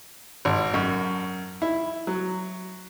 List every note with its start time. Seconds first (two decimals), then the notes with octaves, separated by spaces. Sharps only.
0.45 G#1
0.74 F#2
1.62 E4
2.07 F#3